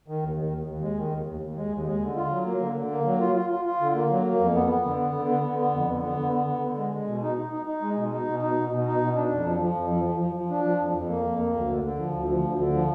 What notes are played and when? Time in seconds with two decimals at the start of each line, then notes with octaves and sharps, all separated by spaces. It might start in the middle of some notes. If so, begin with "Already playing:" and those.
0.08 D#3
0.23 D#2
0.37 D#3
0.52 D#2
0.67 D#2
0.82 G#3
0.97 D#3
1.12 D#2
1.26 D#2
1.41 D#2
1.56 G#3
1.72 D#2
1.87 G#3
2.01 D3
2.16 F4
2.31 F#3
2.46 A#3
2.61 D3
2.76 D3
2.91 A#3
3.05 F#3
3.21 F4
3.36 F4
3.50 F4
3.65 F4
3.81 D3
3.95 A#3
4.10 F#3
4.24 A#3
4.39 F2
4.54 B3
4.69 B3
4.85 D3
4.99 B3
5.14 D3
5.29 B3
5.44 D3
5.59 B3
5.73 F2
5.88 D3
6.03 B3
6.18 D3
6.33 B3
6.47 D3
6.62 D3
6.77 G#3
6.93 G#3
7.07 B2
7.23 D#4
7.38 D#4
7.53 D#4
7.67 D#4
7.81 G#3
7.96 B2
8.12 D#4
8.27 B2
8.42 D#4
8.56 B2
8.72 B2
8.86 D#4
9.01 B2
9.16 D4
9.31 F2
9.46 F3
9.61 F3
9.75 F2
9.90 F3
10.05 F3
10.20 F3
10.36 F3
10.50 D4
10.64 F3
10.80 F2
10.95 F2
11.09 A#3
11.25 F2
11.39 A#3
11.54 D2
11.69 D3
11.84 D3
11.98 F3
12.13 D2
12.29 F3
12.44 D2
12.59 D3
12.73 F3